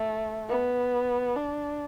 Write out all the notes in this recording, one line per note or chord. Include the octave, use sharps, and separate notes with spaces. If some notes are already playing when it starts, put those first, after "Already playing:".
Already playing: A3
B3
D4